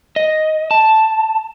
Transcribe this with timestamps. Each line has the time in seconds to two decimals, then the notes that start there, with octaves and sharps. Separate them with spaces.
0.16 D#5
0.71 A5